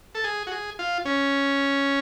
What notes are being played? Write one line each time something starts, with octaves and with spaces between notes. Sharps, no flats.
A4
G#4
F#4
G#4
F4
C#4